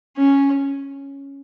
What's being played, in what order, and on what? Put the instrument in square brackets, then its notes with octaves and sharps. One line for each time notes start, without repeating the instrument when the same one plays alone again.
[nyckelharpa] C#4